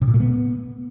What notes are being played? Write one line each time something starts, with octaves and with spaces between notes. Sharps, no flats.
C3
A#2
A3
B3